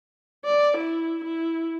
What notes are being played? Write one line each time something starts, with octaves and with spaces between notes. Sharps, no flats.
D5
E4
E4